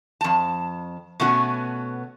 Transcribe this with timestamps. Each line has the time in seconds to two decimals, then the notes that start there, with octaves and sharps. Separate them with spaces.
0.21 F2 A5
1.20 B2 A3 B3 C#4 F#4